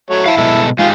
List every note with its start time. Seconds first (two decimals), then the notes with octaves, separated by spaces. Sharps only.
0.10 F#3 A3 C#5
0.26 E4 F5 A5
0.38 B2 G#3 A4
0.79 G#3 D#4 F4 G4